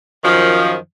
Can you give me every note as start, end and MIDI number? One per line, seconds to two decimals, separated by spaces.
0.24 0.75 42
0.24 0.75 51
0.24 0.75 53